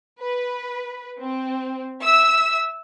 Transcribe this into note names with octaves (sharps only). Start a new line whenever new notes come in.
B4
C4
E5 E6